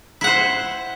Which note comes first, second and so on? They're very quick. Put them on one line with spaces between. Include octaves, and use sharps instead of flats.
E4 F#5 C5